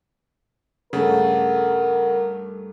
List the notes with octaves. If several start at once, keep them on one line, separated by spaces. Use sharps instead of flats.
G2 C#3 A3 A4 A#4 F#5